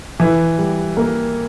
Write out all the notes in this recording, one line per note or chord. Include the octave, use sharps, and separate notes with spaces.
E3
G3
A#3